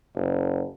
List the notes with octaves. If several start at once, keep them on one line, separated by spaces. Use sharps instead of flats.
F#1